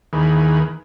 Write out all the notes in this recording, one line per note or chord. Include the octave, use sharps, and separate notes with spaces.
D#2 D#3 E3 G#4 B4